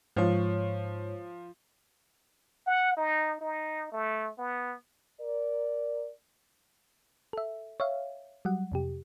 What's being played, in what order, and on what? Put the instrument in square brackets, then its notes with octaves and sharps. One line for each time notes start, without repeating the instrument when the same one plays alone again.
[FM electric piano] G#2 C#5 [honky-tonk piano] F3
[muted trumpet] F#5
D#4
D#4
A3
B3
[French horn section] A#4 D5
[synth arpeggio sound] A4 E5
C#5 E5 F5
F#3 G3 F#5
F2 C3 G4